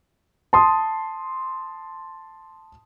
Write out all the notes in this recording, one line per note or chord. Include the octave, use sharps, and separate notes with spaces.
A5 C6 D#6